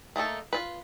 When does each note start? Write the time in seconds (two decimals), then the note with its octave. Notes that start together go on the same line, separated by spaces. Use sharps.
0.16 A3 A#3 D#4 A4
0.53 F4 B4